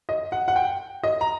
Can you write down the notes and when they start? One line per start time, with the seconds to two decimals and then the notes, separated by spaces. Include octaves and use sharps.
0.09 D#5
0.32 F#5
0.48 F#5
0.56 G5
1.03 D#5
1.21 A#5